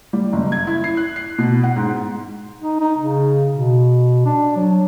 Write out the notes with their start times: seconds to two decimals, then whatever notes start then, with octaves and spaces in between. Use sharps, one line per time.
0.13 G3
0.33 F#1
0.52 G#6
0.67 E4
0.84 C7
0.97 F#6
1.16 C7
1.38 B2
1.64 F#5
1.76 G#2
2.62 D#4
2.80 D#4
2.97 C#3
3.52 B2
4.25 D4
4.56 F#3